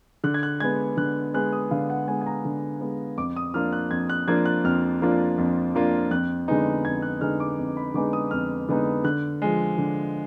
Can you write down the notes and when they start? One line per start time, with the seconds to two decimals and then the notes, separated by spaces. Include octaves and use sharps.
0.24 D3 F#6
0.34 G#6
0.43 F#6
0.60 G#3 B3 G#6
0.97 D3 F#6
1.34 G#3 B3 F#6
1.53 D#6
1.71 D3 F5
1.90 F#5
2.07 G#3 B3 G#5
2.21 G#5
2.27 A#5
2.45 D3
2.81 G#3 B3
3.18 F2 D6
3.36 D#6
3.54 F3 A#3 D4 F4 F6
3.73 F#6
3.90 F2 G#6
4.10 F#6
4.27 F3 A#3 D4 F4 G#6
4.45 F#6
4.64 F2 F6
5.01 F3 A#3 D4 F4
5.38 F2
5.75 F3 A#3 D4 F4
6.11 F2 F#6
6.48 D3 G#3 B3 D#4
6.84 F2 G#6
7.02 F#6
7.21 D3 G#3 B3 D#4 F6
7.40 D6
7.58 F2
7.77 B5
7.94 D3 G#3 B3 D#4 D6
8.13 D#6
8.31 F2 F6
8.69 D3 G#3 B3 D#4
9.04 D3 F#6
9.42 F3 G#3
9.78 D3